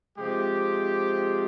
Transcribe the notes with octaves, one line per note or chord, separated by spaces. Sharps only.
C3 F3 G#3 G4